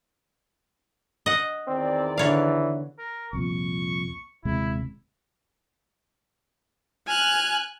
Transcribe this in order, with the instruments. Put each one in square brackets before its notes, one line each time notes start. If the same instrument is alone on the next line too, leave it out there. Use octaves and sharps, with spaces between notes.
[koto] D#5 F#5
[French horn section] E2 D#3 D5 [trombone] C4
[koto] D3 C#5 F5 [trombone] E3
[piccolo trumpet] A#4
[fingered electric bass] C2 F2 A#2 [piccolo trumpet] C#6
[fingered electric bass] D#1 C3 G#3 [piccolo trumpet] E4
[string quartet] G#5 F6 F#6